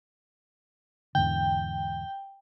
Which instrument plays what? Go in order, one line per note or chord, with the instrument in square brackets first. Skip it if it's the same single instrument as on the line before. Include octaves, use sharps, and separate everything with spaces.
[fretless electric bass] E2 G#2 D3 [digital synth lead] G5